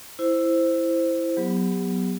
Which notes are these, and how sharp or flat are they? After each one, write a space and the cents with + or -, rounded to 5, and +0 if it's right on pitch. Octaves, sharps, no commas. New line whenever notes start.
E4 +5 C5 +0
F#3 +0 B3 +0 G4 +30